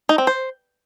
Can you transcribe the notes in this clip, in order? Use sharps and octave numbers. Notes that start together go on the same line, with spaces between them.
D#4
C4
C5